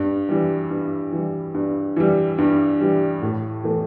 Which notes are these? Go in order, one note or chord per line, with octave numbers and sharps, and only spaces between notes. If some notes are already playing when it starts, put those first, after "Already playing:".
Already playing: G2
E3 G3
G2
E3 G3
G2
E3 G3
G2
E3 G3
A2
E3 A3